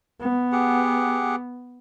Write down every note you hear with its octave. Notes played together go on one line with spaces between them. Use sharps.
B3
G4 G#4 F#5